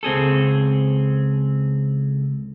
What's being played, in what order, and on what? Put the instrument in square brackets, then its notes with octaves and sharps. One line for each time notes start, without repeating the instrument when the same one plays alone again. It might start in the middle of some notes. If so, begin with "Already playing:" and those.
[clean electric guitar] C#2 C4 G#4 A4